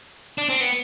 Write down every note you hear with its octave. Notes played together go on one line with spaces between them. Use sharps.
D4
C4
B3